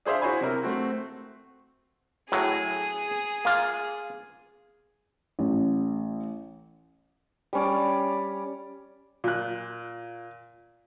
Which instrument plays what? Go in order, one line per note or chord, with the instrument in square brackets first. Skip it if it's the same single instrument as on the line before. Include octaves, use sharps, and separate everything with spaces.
[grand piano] D4 G#4 C5 E5 F5
E4 F#4 C5 C#5 G#5 B5
C3 E4 A#4
A3 C4 F#4
[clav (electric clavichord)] A2 F#3 [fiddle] G#4
[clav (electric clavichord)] A#3 F4
[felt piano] A1
[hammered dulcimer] G3 C#4 D5
[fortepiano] A#2 F#6